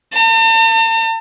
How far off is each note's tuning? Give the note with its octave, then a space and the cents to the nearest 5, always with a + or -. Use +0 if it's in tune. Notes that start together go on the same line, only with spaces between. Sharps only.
A5 +45